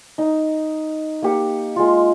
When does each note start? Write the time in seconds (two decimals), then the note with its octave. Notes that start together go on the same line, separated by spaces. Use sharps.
0.18 D#4
1.22 A#3 G4 F#5
1.76 G#3 F4